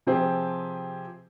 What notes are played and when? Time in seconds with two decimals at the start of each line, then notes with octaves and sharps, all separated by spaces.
0.07 C3 F3 C4 G4 G#4